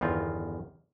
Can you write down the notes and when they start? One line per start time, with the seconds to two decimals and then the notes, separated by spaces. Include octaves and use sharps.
0.01 G1 E2 D#3 F4